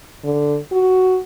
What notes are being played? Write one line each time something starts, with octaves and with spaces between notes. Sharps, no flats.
D3
F#4